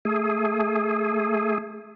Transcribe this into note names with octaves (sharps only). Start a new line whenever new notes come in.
A3 G#4